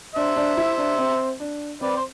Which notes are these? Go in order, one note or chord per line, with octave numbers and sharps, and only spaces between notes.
D4 C5 E5
D4
E4
D4
C4
D4
C4 B4 D5
C5